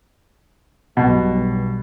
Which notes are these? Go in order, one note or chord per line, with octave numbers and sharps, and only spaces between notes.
B1 G2 B2